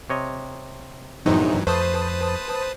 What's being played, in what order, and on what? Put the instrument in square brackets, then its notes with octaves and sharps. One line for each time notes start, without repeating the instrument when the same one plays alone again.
[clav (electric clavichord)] C3 C#5 D#5
[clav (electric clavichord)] A#1 E2 C3 [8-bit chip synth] G2 E3 F#3 [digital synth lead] D#4
[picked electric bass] F2 [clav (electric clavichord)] A3 [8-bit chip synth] B4 A5 D#6 [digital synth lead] C5